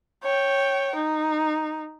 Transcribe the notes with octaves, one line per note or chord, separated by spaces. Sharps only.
C#5 G5
D#4